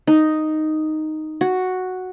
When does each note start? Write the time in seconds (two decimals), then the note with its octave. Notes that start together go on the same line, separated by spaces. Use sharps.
0.07 D#4
1.41 F#4